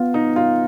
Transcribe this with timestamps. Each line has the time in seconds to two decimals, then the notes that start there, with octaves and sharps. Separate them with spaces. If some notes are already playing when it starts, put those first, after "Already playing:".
Already playing: B3 F4
0.14 D#4
0.36 F4